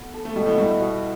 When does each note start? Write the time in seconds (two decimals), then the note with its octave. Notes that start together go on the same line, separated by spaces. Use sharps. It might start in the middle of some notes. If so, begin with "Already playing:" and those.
Already playing: B3
0.14 A4
0.25 A3
0.36 B2 G3
0.46 A2 A3
0.58 G2 G3 E4
0.80 B2